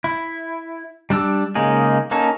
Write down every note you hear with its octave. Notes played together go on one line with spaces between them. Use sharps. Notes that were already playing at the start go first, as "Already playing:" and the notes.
E4
G3 D4 D5 E6
C#3 G#3 A#3 D#4 G#4
A#3 C#4 D#4 A4